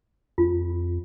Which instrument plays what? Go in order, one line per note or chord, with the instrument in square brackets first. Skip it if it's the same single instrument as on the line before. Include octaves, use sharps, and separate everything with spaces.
[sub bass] F2 [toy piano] F4